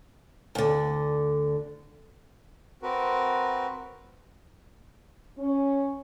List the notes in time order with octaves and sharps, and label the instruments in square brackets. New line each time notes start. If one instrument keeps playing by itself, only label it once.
[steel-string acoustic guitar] D2 D3
[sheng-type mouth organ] C4 F#4 A#4 B4
[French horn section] C#4